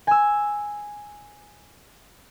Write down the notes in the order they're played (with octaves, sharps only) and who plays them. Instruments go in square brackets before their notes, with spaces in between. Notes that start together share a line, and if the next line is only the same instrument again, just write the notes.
[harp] G#5 E6